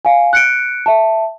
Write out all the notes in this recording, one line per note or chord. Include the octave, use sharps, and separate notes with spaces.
F5 G#5
F#6 C#7 D7
E5 A5